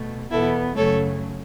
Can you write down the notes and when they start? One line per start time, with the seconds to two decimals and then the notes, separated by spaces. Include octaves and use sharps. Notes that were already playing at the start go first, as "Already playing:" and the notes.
Already playing: B2 A3
0.31 E2 B2 B3 E4 A4
0.76 F#2 C#3 F#3 A3 A4 C#5